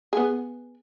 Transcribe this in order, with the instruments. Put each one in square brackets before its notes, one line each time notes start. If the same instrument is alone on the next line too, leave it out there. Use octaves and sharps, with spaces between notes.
[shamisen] B3 G#4